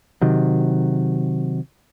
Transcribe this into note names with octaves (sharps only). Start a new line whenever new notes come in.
C3 D#3 F#3